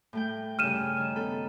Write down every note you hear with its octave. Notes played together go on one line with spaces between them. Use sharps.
A2 A3 G5
G2 C#3 F6 D#7 E7
D#3
B3 A4 B5